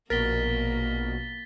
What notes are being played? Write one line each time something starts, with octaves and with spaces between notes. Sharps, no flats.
A#1 B2 A#3 A#4 A6 B6 G7